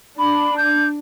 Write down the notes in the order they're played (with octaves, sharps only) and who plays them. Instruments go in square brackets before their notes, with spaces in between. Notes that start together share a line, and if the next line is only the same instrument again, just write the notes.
[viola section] D4 [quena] B5
[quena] G6